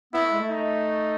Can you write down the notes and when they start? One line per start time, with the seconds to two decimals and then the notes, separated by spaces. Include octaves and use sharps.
0.13 B3 E4
0.22 A3
0.31 G#3
0.38 A3
0.50 D#4